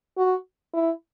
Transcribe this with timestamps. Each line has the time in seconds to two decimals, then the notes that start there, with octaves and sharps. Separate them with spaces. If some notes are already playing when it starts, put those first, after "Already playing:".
0.18 F#4
0.74 E4